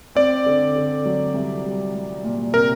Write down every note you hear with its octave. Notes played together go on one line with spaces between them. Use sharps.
C4 D5
D3
D3
F#3
C2
G3
G3
A#2
C3 A#4